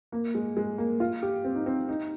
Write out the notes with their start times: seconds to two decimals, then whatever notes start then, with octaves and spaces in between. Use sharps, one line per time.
0.12 A#3
0.35 G#3
0.57 G#3
0.78 A#3
1.00 F4
1.22 G4
1.44 C4
1.55 D#4
1.66 C4
1.88 D#4